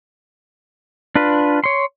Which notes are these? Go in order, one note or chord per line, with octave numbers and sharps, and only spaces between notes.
D4 F4 B4
C#5 C6